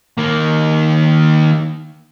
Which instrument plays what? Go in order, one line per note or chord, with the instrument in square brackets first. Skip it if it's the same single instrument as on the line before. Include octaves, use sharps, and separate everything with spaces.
[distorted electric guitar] D#3 A#3